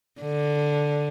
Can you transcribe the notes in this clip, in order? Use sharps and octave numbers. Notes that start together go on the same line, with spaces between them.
D3